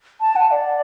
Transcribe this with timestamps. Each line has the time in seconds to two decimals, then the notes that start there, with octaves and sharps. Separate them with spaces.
0.21 A5
0.36 F#5
0.51 D5